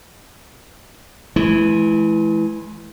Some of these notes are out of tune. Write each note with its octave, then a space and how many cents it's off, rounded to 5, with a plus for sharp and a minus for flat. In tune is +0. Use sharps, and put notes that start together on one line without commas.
E3 +0 G#3 +45